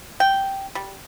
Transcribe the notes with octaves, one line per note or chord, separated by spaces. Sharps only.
G5
G3